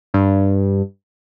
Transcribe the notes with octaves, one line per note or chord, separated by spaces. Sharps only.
G2